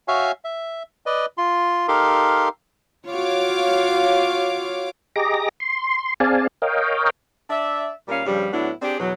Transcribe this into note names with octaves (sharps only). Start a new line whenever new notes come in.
F#4 C#5 E5 F5 G#5
E5
B4 D5 D#5
F4 C6
D#4 G4 A4 A#4 F5 C6
F4 F#4 C#5 F5 D6
G4 G#4 D#5 A#5 D6 A#6
C6
C4 G#4 D5 F5 G#5 A5
A#4 C#5 D#5 F5 G5
D4 D5 E5
A#2 G3 C#4 A#4 F5
G2 C#3 F3 G3
A2 F#3 B3 D4 E4
C4 D4 G4 G#4
E2 B2 F#3